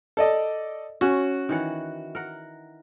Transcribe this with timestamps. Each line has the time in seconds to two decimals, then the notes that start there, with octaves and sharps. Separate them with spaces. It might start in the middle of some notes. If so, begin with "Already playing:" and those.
0.17 A4 D5 D#5
1.01 C#4 F#4
1.49 D#3 E3 F#5
2.15 A#4 F#5